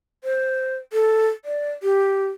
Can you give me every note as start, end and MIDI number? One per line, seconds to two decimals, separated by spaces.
0.24 0.76 72
0.93 1.27 69
1.45 1.72 74
1.83 2.27 67